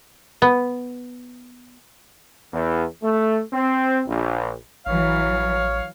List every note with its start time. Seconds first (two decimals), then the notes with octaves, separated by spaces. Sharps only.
0.42 B3
2.53 E2
3.02 A3
3.53 C4
4.08 A#1
4.86 A1 E3 F#3 C#5 F5